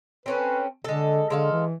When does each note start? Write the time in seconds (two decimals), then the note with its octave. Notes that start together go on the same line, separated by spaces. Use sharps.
0.26 C4 C#4 A4 B4
0.84 D3 G#3 A4
1.30 D3 G#3 A4 F5
1.52 E3